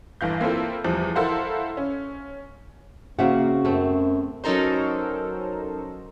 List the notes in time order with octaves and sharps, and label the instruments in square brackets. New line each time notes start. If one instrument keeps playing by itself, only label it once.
[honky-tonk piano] G1 E3 F5 G6
A#3 C4 E4 F4 A4
E2 F3 G3
E4 A4 A#4 C5 F5 F#5
C#4
[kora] C#3 C4 [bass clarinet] A#3 [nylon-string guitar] F#4 E5 F#5
[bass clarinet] F#2 [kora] A3 C4
[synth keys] F#3 C#4 D#4 A4 A#4 C5